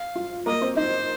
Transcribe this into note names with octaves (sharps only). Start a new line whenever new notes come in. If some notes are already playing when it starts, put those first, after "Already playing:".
Already playing: F5
F4
A#3 A#4 D#5
C4 C5
D#4 C5 D#5